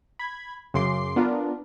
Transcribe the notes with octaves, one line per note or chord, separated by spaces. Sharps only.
B5 G#6
F#2 C#3 C6 D6 C7
B3 D4 F4 A#4